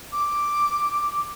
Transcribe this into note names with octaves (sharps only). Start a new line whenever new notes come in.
D6